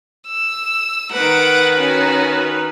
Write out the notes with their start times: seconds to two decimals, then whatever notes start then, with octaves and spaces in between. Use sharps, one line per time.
0.28 E6
1.12 D#3 B4 F#5 D7
1.77 C#4 F#4